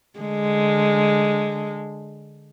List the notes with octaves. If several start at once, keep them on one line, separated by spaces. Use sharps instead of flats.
D3 G#3